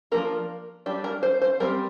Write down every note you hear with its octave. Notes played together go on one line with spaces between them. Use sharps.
F3 A#3 D4 A#4
G3 D4 G4
A#4
C5
C5
G3 C4 A#4